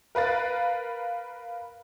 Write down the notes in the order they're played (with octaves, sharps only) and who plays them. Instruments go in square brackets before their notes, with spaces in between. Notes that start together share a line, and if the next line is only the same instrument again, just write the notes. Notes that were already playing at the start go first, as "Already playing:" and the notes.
[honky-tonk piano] A#4 B4 F5 A6